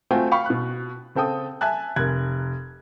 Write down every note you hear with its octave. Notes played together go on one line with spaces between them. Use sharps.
A3 C4 F4 F#4 G5 G#5
F5 G5 B5 C#6
B2 F#6
C#3 C4 A4 G5 D#6
E5 G#5 A5 F#6
F1 A#4 F#6 G#6